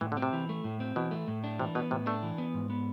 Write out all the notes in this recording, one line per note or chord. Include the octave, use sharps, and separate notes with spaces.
A2 E3
D3
C4
C3
E3
A3
A2
C4
B2 E3
A3
A2
D4
C3 E3
B2 B3
A2 C3
A3 D4
E3
B3
G#2
B3